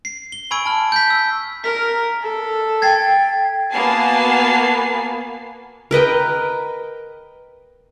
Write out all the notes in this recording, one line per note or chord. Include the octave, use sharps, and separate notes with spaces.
C7
G7
G#5 B5 C#6 E6 G#6 D7
A5 F6
G6 B6
E6
A#4 B6
A4
G5 G#6 A6 C7
A#3 B3 F#4 G#5 A5 C7
A#4 B4 D#5 G5